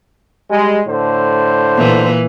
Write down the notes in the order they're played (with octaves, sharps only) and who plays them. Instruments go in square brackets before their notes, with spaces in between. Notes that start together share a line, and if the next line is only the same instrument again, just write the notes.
[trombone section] G3 G#3
A2 D3 C5
[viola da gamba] A#2 E3 A#3